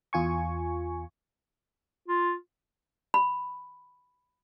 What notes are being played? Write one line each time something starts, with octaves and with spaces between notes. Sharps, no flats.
E2 F4 G#5 C#6
F4
B5